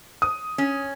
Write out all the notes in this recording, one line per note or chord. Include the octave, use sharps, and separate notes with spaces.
D#6
C#4